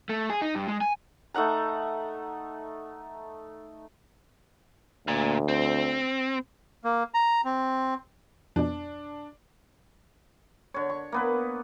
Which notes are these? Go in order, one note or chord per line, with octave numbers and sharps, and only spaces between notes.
A3
G#4
D#4
G2
G#3
G#5
A3 D#4 F#5 A#5
D2 A#2
C4
A#3
A#5
C4
F2 B2 D4
D3 C#5
C#6
A#3 B3 B4